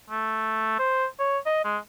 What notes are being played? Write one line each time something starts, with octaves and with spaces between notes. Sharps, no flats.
A3
C5
C#5
D#5
G#3